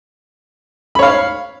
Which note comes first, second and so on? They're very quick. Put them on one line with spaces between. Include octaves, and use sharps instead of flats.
B5 C#5 F5